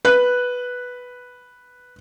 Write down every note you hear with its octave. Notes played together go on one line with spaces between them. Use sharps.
B4 F#6